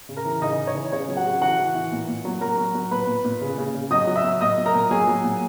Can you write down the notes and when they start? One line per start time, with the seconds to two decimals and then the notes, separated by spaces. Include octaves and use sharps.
0.09 C#3
0.17 A#4 A#5
0.25 E3
0.42 C#3 D#4 D#5
0.59 C#3
0.67 C#5
0.75 E3
0.92 C#3 C#5
1.08 F#3
1.17 F#4 F#5
1.26 C#3
1.41 E3 F#4 F#5
1.58 E3
1.75 E3
1.92 A#2
2.09 A#2
2.25 F#3
2.41 F#3 A#4 A#5
2.58 F#3
2.75 F#3
2.91 A#2 B4 B5
3.08 A#2
3.25 A#2
3.41 C#3
3.58 C#3
3.75 C#3
3.91 F#3 D#5 D#6
4.07 F#3
4.16 E5 E6
4.24 F#3
4.41 A#2 D#5 D#6
4.58 F#3
4.66 A#4 A#5
4.74 A#2
4.91 F#3 G#4 G#5
5.07 F#3
5.24 A#2